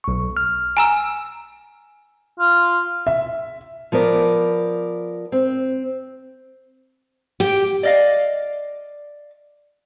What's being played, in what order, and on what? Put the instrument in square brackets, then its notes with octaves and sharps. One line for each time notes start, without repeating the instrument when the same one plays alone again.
[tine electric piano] B1 C#6
F6
[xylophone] G#5 A#5 E6
[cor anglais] F4
[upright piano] E5
[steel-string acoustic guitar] F3 B3 A#4 D5
C4
G4
[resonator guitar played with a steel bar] D5 D#5 F5